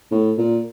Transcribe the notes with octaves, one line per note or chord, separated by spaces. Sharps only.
A2
A#2